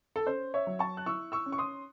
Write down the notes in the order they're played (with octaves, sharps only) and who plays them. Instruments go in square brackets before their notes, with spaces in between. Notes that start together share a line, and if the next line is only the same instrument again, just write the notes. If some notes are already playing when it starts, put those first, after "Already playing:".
[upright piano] A4
C#4 C5
C#5 E5
F#3
A5 C#6
F#6
E4 C#6 E6
C#6 E6
C#4
C#6
C6 D#6